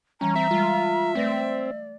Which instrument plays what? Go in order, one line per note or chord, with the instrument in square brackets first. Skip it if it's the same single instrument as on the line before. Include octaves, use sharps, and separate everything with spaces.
[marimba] E3 G3 [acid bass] C#4 [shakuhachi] A#5
[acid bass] C4 [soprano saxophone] E5
[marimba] G3 G#3 [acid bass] F4
[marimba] A3 B4 A#6 [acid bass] C4 [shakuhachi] D5